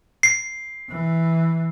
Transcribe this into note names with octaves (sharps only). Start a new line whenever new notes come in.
C7
E3